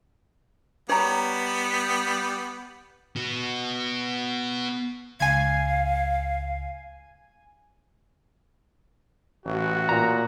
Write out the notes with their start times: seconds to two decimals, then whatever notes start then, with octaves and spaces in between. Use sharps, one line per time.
0.89 G3 B3 C#5 A#5
3.16 B3 F#4
5.20 C#2 F5 G#5 G#6 C7
9.46 A1 F#4
9.89 A#2 A#5